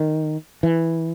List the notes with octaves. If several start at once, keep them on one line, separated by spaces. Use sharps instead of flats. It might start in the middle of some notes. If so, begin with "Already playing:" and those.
Already playing: D#3
E3